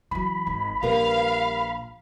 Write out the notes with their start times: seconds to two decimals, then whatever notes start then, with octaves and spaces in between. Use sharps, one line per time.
0.11 E3 F#3 B5
0.47 G#1
0.83 A#1 G3 A#4 B4 F5